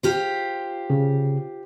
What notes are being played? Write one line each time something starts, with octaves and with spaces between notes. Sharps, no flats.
F4 G4 C5
C#3